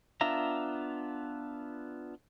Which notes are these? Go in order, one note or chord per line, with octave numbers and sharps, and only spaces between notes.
B3 D4 F4 E5 A#5